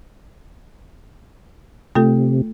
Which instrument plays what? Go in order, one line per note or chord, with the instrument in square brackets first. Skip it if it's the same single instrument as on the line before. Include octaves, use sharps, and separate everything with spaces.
[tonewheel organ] C3 [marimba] A3 F4 A4